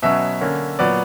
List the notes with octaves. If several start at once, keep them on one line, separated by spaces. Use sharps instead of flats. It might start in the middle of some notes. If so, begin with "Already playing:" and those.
B2 F#3 C#4 E5
D3 A#3 C#4
A#2 F#3 B3 D5